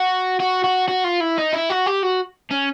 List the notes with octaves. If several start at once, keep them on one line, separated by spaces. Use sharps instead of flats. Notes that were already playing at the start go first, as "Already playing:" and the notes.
Already playing: F#4
F#4
F#4
F#4
F4
E4
D#4
E4
F#4
G4
F#4
C#4